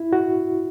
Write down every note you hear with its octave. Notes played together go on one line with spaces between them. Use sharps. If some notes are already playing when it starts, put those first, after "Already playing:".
Already playing: E4
F#4